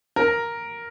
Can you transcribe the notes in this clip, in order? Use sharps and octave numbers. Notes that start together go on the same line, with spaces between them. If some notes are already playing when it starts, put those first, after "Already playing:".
A#4